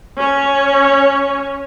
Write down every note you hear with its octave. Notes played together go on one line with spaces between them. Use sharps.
C#4 C#5